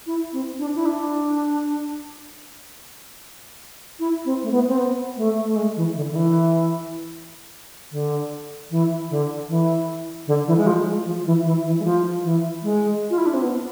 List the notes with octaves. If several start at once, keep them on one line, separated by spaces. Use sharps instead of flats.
E4
C4
D4
E4
D4
E4
C4
A3
B3
C4
B3
A3
A3
G#3
E3
D3
D3
E3
D3
E3
D3
E3
D3
E3
G#3
F3
G#3
F3
E3
E3
E3
G#3
F3
E3
G#3
F4
E4
D4
C4
B3